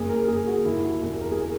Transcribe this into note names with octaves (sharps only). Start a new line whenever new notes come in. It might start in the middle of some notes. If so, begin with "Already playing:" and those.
Already playing: F#1 G#4
A#4
F#1 G#4
F#4
D#2 E4
F#4
E1
A#4
G#4
A#4